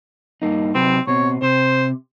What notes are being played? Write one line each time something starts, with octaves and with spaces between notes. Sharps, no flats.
G2 A#3 D#4
C3 F#3 C4 B4
B2 C4 C#5
C3 C5